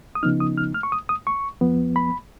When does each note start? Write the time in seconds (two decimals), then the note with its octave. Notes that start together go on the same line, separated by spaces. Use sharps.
0.15 D#6
0.23 C#3 F3 B3 D#4 F6
0.40 D#6
0.58 F6
0.74 F6
0.83 C#6
0.92 D#6
1.09 D#6
1.27 C#6
1.61 F2 F3 B3
1.96 B5